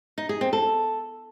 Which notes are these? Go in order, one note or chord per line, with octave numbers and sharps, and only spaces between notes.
D#4
G#4
C4
A4